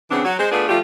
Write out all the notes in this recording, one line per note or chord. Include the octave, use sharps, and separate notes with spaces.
C#3 E3 B3 C4 D4
F#3
G#3 C5
A3 B3 D4 F4 G#4
F3 G3 A3 F4 G4